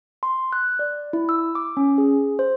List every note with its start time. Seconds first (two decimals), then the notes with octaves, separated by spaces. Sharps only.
0.23 C6
0.53 F#6
0.79 D5
1.13 E4
1.29 E6
1.55 D6
1.77 C#4
1.98 G#4
2.39 C5